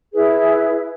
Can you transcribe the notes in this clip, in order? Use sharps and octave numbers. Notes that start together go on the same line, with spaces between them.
E4 G#4 B4 E5